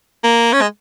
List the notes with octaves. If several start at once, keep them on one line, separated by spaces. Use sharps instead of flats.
A#3
C#4
G#3